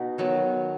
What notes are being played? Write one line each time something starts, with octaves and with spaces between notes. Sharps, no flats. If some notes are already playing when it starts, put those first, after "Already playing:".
Already playing: B2 D#4
D#3 F#3 B3